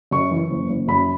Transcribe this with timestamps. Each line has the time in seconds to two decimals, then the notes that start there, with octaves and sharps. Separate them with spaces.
0.11 F#2 C#6
0.31 E3
0.50 F#1
0.70 F#1
0.88 F#2 B5